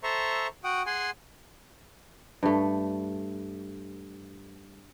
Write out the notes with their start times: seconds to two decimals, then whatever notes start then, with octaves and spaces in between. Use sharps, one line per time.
0.03 A4 C5 E5 A#5 C#6
0.64 F#4 F#5 G5 D#6
0.86 G#4 F#5 G#5 C6
2.43 G2 A3